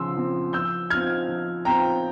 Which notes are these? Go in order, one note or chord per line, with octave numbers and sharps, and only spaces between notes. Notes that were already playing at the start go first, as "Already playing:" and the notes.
Already playing: C#3 F3 C6 E6
F3 C4
F3 E6 G6
C4 F4 F6 G#6
F3
C4 F4 G5 A#5